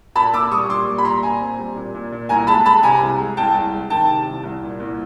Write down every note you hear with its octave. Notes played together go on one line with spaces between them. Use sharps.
A#2 A5 B5
A#2 D6 E6
G3 C#6 D#6
A#2 C6 D6
G3
B5
A#2 A#5 C6
A#2 G#5 A#5
C4
G3
A#2
A#2
A#2
C2 G#5 A#5
G#3 A5 B5
G#3 A5 B5
C3 G#5 A#5
C2
G#3
C2 G5 A5
C2
G#3
D#3 G5 A5
C3
C2
C2
A#2
C2